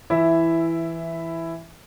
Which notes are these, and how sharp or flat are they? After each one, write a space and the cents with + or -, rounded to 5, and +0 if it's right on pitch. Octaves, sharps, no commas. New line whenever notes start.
E3 +5 E4 +10 E5 +0